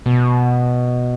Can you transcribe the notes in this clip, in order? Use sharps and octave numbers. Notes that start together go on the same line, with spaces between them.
B2